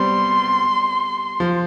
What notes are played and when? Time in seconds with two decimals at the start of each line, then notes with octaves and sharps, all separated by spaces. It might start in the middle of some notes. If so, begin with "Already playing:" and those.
Already playing: G3 B3 C4 C6
1.40 F3